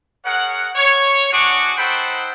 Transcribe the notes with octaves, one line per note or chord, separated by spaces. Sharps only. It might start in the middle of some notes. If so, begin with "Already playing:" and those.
G#4 A#4 C#5 F#5
C#5
D4 F#4 G#4 F#5 C#6 D6
D#4 A4 C5 F#5 G5 B5